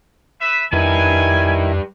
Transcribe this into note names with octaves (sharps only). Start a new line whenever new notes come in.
B4 E5
F2 D#3 G3 E4 B4 G#5